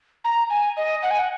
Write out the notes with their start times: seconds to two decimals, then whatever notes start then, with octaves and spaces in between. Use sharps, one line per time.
0.24 A#5
0.50 G#5
0.77 D#5
1.03 F#5
1.11 G#5
1.19 F#5